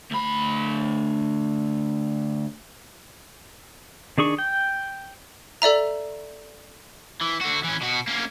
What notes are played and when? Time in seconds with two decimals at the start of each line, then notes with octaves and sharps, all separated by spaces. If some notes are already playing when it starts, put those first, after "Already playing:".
0.11 D2 B5
4.18 D#3 D4 G#4 C#6
4.38 G5
5.62 A4 D5 E5 A#5
7.21 E3
7.41 D3 F#4
7.64 E3 C#4
7.81 B2 F#4
8.07 A#3 C#4